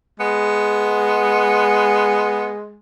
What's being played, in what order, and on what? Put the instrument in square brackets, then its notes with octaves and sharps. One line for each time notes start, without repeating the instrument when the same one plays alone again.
[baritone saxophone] G#3 [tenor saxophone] B3